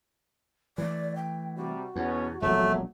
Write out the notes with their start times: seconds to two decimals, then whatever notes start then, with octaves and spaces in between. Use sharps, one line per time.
0.78 E3 A3 D5
1.16 G5
1.56 C3 G3 F#4
1.96 E2 B2 B3 C#4
2.42 E1 A#1 F#3 A3